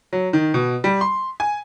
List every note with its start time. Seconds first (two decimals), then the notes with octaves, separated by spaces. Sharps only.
0.13 F#3
0.33 D#3
0.54 B2
0.84 G3
1.01 C6
1.40 G#5